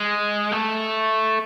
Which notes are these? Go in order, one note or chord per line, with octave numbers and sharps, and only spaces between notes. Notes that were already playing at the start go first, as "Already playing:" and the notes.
Already playing: G#3
A3